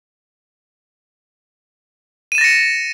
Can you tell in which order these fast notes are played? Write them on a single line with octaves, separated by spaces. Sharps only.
D#7 E7 A6 A#6 C#7